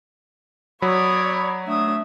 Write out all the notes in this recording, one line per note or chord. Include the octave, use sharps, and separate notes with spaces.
F#3 C#5 D5 B5 D#6
A3 D4 E5 D#6